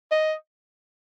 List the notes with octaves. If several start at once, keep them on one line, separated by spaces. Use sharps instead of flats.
D#5